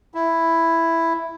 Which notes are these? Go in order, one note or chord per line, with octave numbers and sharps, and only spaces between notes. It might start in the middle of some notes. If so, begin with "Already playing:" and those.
E4